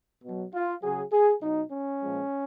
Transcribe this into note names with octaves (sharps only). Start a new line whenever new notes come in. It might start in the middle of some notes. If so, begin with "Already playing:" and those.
B2 F#3
F4
C#3 F#3 G#4
G#4
B2 F#3 D#4
C#4
A#2 F3 G#3